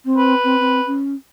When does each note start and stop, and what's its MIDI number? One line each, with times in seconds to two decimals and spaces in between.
0.05 0.34 60
0.18 0.95 71
0.44 0.58 60
0.59 0.80 60
0.86 1.14 61